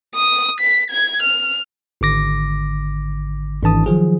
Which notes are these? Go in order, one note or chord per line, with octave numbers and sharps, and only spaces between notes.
D#6
B6
G#6
F6
G#1 D3 D6 A#6
G#1 E3 D4 A5 D#6
D#3 F3 F#3 G#4